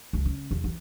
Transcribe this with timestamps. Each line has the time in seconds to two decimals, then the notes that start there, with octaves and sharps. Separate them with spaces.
0.13 C#2
0.25 C#3
0.51 E2
0.64 E3